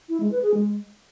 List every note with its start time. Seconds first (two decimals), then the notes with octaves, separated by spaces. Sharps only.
0.09 E4
0.20 G#3
0.32 B4
0.43 G#4
0.54 G#3